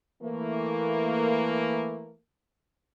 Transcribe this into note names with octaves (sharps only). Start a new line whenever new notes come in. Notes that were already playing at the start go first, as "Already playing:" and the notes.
E3 A3 A#3